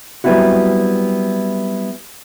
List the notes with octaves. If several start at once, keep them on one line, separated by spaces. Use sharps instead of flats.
F#3 G3 B3 C4 E4 F#4